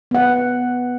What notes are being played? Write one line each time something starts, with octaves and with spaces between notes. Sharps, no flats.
B3 F#5